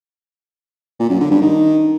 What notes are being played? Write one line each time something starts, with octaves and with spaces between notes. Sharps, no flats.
A#2
F#2
D3
G2
D#3